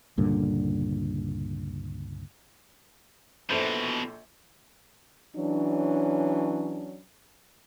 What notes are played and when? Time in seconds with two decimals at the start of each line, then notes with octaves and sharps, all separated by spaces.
0.17 C#2 G2 A#2 D3
3.50 A#1 B2 E3 A4 C5
5.36 E3 F#3 C#4 D4